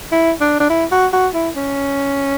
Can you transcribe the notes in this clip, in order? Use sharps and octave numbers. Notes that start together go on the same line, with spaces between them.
E4
D4
D4
E4
F#4
F#4
E4
C#4